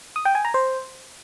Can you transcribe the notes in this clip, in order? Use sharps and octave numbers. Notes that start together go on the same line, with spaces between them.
D#6
G5
G#5
A#5
C5